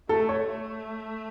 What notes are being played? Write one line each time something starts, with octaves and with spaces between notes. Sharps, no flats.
A3 A4
C#5
A3